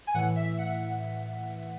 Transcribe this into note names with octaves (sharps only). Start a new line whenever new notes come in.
G#5
A2 E3 F#5
E5
F#5